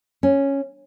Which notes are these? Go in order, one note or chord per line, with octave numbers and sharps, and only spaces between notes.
C#4